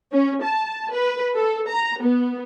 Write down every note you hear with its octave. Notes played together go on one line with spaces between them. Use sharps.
C#4
A5
B4
A4
A#5
B3